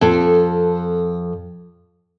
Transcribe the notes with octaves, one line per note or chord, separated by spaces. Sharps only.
F2 A4